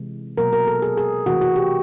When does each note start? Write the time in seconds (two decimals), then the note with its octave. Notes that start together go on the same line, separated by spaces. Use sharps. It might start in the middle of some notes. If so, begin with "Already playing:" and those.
Already playing: C3 E3 G#3
0.38 B2 F#3 A#3 A#4
0.53 A#4
0.67 A4
0.82 G#4
0.97 G#4
1.26 C3 E3 A3 F#4
1.41 F#4
1.56 G4